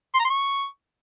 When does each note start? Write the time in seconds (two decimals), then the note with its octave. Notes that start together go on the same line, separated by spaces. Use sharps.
0.14 C6
0.20 A#5
0.25 C6
0.30 C#6